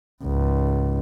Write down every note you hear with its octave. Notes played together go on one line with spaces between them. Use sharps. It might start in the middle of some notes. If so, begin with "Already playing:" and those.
C#2 G#2